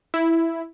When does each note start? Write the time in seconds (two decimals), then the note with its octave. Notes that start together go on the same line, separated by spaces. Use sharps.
0.14 E4